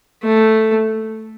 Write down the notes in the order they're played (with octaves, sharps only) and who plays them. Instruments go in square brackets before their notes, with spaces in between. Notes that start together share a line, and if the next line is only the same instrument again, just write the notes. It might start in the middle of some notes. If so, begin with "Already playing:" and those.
[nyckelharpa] A3